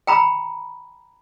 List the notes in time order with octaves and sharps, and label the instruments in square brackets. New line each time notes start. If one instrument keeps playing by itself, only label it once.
[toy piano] G5 A#5 B5